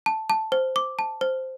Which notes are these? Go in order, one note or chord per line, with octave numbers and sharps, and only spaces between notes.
A5
A5
C5
D6
A5
C5